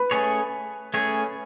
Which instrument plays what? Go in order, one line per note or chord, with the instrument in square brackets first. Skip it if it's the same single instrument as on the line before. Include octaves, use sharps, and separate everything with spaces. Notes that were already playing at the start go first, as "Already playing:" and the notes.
Already playing: [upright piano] B4 B5
[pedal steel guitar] A3 C#4 G#4 C#5
A3 C#4 G#4 C#5